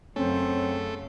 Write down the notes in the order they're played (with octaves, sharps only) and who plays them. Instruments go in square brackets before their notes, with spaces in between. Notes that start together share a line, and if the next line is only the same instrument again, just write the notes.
[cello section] F#2 C#3 [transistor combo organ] A3 [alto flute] C4 [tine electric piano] C#4